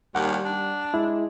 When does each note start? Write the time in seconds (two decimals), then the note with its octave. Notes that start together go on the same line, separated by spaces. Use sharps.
0.15 D#2 G3 F#5
0.45 D4
0.94 G#3 E4